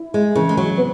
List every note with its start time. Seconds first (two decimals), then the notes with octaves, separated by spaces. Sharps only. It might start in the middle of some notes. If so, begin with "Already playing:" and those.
Already playing: E4
0.14 G#3
0.35 C#3 E3
0.49 G#3
0.57 F#3
0.78 B3